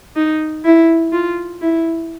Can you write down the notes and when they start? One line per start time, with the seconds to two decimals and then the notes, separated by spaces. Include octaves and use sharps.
0.16 D#4
0.65 E4
1.12 F4
1.61 E4